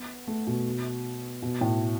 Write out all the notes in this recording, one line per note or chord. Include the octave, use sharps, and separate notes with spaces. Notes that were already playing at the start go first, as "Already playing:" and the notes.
Already playing: B3
A3
B2
B2
A2